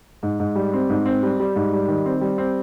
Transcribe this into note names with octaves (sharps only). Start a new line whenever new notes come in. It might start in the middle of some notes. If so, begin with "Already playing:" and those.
G#2
G#2
G3
C4
G#2
C4
G3
G3
G#2
G3
D#3
C4
G3
C4